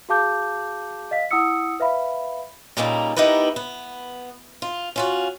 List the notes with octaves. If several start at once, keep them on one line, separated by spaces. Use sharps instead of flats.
F#4 G#4 F5 A5 D6 G6
D#5 F5 B6
E4 F#5 D#6 E6 C#7
B4 E5 F5 B5
A#2 C#3 G3 A#3 D#4 A4
B3 D#4 E4 G4 A#4 B4
B3
F4
C#4 F4 F#4